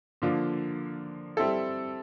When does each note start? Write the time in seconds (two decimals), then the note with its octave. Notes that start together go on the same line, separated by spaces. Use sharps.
0.22 D3 F3 A#3 D4 F4
1.37 G3 C4 E4 A4